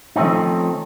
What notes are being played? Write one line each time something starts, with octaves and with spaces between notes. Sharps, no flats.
D#3 F3 A3 C4 C#4 D#4